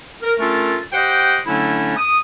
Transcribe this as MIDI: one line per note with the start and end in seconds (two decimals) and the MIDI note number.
0.23 0.33 70
0.39 0.78 57
0.39 0.78 61
0.39 0.78 62
0.39 0.78 65
0.39 0.78 69
0.39 0.78 70
0.93 1.39 67
0.93 1.39 72
0.93 1.39 75
0.93 1.39 78
0.93 1.39 79
1.47 1.96 50
1.47 1.96 54
1.47 1.96 57
1.47 1.96 61
1.47 1.96 62
1.47 1.96 64
1.97 2.18 87